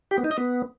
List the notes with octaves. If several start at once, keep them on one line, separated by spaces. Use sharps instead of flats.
G4
B3
D#4
D#5
B3